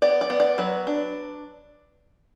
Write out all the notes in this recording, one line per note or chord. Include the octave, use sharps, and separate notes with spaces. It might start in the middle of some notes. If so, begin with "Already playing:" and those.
B3 D5
D5
B3
D5
F#3 B4
D4